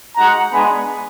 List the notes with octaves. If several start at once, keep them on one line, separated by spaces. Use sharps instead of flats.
G#3 D#4 F#4 F#5 A#5
G#3 B3 D4 G#5 B5